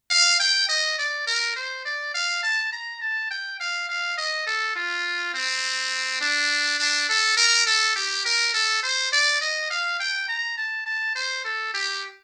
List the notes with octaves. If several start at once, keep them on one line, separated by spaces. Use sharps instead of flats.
F5
G5
D#5
D5
A#4
C5
D5
F5
A5
A#5
A5
G5
F5
F5
D#5
A4
F4
C4
D4
D4
A4
A#4
A4
G4
A#4
A4
C5
D5
D#5
F5
G5
A#5
A5
A5
C5
A4
G4